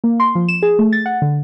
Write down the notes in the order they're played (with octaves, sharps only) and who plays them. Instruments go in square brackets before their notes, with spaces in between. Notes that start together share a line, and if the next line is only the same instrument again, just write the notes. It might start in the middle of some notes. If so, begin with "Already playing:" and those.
[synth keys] A#3
C6
F3
E7
G#4
A3
A6
F#5
D3